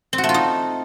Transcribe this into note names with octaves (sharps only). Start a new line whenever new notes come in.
C4
F#4
A3
F4
D#4